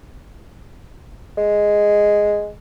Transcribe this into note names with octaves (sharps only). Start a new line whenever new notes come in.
G#3